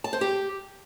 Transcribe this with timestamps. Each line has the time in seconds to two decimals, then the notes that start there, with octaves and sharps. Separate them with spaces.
0.04 A5
0.13 C5
0.21 G4